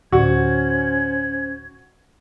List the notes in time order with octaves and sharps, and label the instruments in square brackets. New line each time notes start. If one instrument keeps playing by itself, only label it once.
[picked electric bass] D1 [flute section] C#4 C5 G#6 [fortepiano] F#4